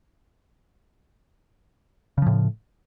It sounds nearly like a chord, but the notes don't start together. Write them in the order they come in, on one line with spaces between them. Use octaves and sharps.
C#3 F3 A2